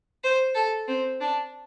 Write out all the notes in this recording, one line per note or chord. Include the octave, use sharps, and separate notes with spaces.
C5
A4
C4
D4